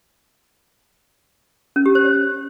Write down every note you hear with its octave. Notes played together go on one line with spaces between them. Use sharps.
C#4
G4
C5
C#5